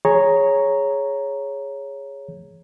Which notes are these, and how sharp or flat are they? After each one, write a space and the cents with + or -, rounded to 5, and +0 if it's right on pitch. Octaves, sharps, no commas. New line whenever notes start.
G#4 +0 C#5 +0 A#5 +0